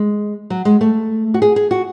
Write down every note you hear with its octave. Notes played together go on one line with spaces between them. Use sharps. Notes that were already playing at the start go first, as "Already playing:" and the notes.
Already playing: G#3
F#3
G#3
A3
F#4
G#4
G#4
F#4